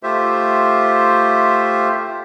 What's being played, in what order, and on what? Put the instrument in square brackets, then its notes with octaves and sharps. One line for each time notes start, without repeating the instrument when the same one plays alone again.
[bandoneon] A3 F4 G4 C5 E5